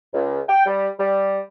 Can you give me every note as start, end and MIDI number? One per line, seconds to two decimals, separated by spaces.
0.13 0.39 37
0.48 0.63 79
0.66 0.88 55
0.99 1.41 55